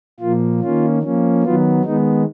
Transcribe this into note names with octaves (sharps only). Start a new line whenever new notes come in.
A#2 F3 A#3 F4
D#3 A#3 C#4 F4
F3 A#3 C#4
D#3 F#3 B3 F4
D#3 G#3 B3 D#4